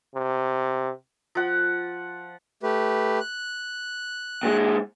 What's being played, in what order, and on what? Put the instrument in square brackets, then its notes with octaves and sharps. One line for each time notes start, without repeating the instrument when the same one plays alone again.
[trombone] C3
[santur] F3 F#5
[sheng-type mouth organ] A3 G4 B4
F#6
[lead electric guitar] A#2 G#3